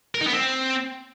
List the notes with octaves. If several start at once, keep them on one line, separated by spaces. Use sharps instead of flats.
A#4
D#4
B3
C4